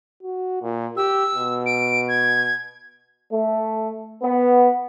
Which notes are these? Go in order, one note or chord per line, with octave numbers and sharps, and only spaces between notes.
F#4
A#2
G4 E6
B2
D7
G#6
A3
B3